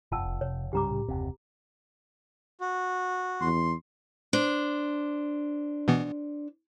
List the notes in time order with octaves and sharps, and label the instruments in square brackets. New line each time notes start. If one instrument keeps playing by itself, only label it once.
[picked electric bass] F1 [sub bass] F#2 [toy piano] F4 A5 E6
[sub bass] E1
[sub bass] C3 [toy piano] C#5
[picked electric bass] C2 C#3 G3 [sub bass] G2 [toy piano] G4 A#5 D6
[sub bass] A2
[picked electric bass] F#1 C3 [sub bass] D#2
[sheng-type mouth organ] F#4
[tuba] E2 [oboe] C6
[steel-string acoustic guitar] D4 C5
[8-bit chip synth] B2 E3 B3